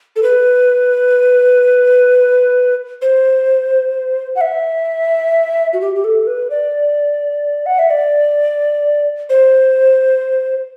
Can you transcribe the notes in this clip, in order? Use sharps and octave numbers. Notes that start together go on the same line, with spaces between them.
A4
B4
C5
F#5
E5
F#4
G4
G4
A4
B4
D5
F#5
E5
D5
C5